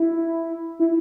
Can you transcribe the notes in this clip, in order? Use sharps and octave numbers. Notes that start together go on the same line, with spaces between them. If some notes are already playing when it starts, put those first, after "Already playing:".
Already playing: E4
E4